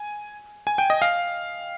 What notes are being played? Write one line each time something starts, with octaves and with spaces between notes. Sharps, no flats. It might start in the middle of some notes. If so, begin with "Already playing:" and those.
Already playing: G#5
G#5
G5
D#5
F5